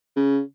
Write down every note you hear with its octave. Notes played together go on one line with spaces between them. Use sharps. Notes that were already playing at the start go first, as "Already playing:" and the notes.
C#3